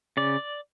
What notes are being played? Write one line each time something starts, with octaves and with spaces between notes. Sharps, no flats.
C#3 D5